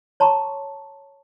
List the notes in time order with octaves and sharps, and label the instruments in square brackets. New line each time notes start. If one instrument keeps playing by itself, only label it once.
[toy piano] C#5 A5 A#5 C6 C#6